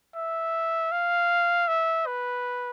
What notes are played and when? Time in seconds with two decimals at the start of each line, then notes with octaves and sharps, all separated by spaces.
0.15 E5
0.92 F5
1.68 E5
2.07 B4